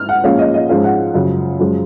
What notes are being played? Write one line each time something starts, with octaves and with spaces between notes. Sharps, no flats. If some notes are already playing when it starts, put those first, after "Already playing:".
Already playing: F6
F#5
A#2 F3 G#3 C#4 F5
D#5
D#5
G#2 F3 G#3 C#4 F5
F#5
F#2 C#3 F3
F#2 F3 G#3